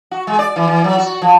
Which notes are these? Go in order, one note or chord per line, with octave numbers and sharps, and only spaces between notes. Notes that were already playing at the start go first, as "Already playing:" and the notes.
F#4
G#3
D5
E3
E3
F#3
F#4
F3